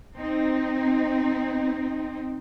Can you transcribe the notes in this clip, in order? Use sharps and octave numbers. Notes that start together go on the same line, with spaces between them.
C4 D#4